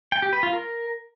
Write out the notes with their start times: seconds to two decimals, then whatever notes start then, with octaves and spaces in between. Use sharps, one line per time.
0.12 G5
0.22 G4
0.33 B4
0.43 F4
0.53 A#4